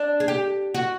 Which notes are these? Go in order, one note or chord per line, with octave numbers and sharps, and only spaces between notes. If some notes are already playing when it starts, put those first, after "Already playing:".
Already playing: D4
G#4
G4
F#4